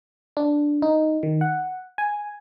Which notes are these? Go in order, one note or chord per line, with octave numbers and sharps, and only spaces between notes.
D4
D#4
D#3
F#5
G#5